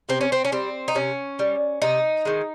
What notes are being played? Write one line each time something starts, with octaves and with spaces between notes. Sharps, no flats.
C3 C4
C#4
C4
C#4
G3 C4
D#4
C3 C#4
G3
C3 D#4
D#3 G#3